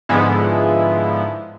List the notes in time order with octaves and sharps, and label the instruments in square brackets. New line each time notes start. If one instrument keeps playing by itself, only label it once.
[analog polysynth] G#2 D3 F3 G#3 B3 E4